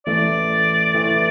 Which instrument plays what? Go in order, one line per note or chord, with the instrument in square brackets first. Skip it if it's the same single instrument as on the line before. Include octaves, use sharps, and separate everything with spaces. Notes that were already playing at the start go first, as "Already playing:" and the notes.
[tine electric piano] E3 A3 [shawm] D5
[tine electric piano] E3 A3